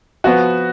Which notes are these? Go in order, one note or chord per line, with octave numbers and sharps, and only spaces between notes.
F3 B3 F#4